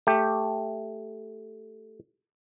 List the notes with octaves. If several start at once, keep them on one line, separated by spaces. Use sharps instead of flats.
A3 G4